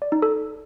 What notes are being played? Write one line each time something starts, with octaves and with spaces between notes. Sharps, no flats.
D5
D#4
A4